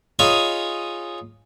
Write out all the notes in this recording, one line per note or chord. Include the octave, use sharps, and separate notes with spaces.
D#4 F4 G#4 C#5 G#5 B5